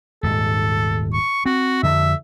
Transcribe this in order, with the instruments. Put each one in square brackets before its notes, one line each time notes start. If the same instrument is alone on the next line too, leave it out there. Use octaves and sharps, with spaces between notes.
[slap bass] D#1 G#2 [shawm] A4
[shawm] C#6
[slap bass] C4 [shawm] F#4
[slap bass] F2 D3 [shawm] E5